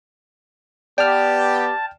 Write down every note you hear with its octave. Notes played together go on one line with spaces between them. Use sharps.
B3 G4 D5 G5 A5 F6